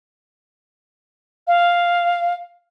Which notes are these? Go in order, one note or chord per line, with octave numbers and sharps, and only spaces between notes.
F5